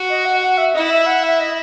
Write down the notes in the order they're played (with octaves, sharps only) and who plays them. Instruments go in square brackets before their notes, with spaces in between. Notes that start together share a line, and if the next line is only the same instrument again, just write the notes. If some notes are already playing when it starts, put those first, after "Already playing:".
Already playing: [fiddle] F#4
[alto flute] D#5
F#5
F#5
E5
[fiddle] E4 [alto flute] D#5
[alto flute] E5
F#5
E5
D#5